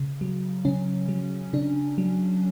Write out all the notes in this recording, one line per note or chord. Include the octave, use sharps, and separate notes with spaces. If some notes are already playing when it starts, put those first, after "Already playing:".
Already playing: C#3
F#3
C#3 C#4
F#3
C#3 D4
F#3